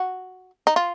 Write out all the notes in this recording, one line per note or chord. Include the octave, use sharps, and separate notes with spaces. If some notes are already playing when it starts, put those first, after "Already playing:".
Already playing: F#4
D#4
F4